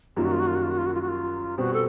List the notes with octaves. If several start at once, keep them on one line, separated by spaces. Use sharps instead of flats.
F#2 D#3 G3 A#3 F4
F#4
F4
F#4
F4
F#4
F4
F#4
F4
F#4
F4
F#4
F4
B2 G3 C4 F#4
A4